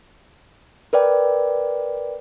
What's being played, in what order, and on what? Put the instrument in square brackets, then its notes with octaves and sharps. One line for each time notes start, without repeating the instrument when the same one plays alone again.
[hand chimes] A#4 B4 D5 G5